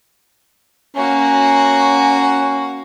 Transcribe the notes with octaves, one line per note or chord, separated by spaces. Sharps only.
A#3 C#4 F#4